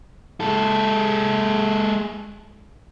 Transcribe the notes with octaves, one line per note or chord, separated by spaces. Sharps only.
G#3 A4